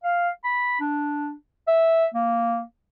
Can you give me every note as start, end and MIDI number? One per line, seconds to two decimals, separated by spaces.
0.04 0.29 77
0.44 0.79 83
0.80 1.34 62
1.68 2.06 76
2.14 2.64 58